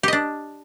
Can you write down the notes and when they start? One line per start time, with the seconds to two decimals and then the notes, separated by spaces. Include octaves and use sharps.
0.03 G4
0.08 D#5
0.13 D4